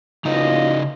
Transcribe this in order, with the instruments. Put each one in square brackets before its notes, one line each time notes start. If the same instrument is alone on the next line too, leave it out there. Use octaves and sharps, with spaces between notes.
[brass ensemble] F#1 F4 D#5 [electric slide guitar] C#3 D#4